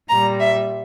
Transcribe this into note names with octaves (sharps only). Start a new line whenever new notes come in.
A#2 G3 A#5
E5